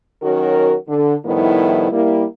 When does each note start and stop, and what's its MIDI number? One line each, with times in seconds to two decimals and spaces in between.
0.23 0.75 51
0.23 0.75 54
0.23 0.75 61
0.23 0.75 66
0.23 0.75 70
0.88 1.14 50
1.25 1.88 45
1.25 1.88 51
1.25 1.88 53
1.25 1.88 55
1.25 1.88 59
1.25 1.88 64
1.92 2.24 55
1.92 2.24 58
1.92 2.24 64